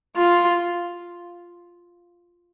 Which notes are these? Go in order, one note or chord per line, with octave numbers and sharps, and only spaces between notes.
F4